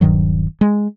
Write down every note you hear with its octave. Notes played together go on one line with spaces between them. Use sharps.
D#1 G2 D#3 F#3
G#3